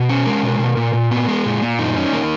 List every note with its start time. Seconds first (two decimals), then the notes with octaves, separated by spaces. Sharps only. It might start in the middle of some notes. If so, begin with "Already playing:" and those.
Already playing: B2
0.09 C#4
0.26 G#3 A#4
0.43 B2
0.59 B2
0.77 A#2
0.93 A#2
1.11 B3
1.28 G#3
1.45 A#2
1.62 A#2
1.79 F#2 D#4
1.96 C#4
2.13 A#3